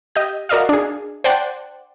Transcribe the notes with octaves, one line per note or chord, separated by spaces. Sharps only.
G4 D#5
F#4 A#4 D5 D#5 F5
D4 G#4
C5 D5 F#5 G5 A5 C6